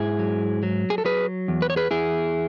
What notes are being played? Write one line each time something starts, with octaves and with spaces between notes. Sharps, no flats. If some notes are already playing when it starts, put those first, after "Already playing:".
Already playing: G#2 E4 G#4
F#3
F#3
G#4
A4
F#3 G#4 B4
E2
B4
C#5
G#4 B4
E2 E4 G#4